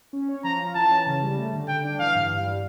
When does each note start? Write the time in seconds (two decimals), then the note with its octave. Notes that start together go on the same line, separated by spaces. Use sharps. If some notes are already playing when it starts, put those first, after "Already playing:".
0.13 C#4
0.29 C#5
0.44 F3 A#5
0.60 F4
0.75 E3 A5
0.91 C#4
1.07 C#3
1.22 G3
1.37 A3
1.53 D3
1.68 D3 G5
1.84 D4
1.99 E3 F5
2.15 G2
2.31 G2
2.46 G3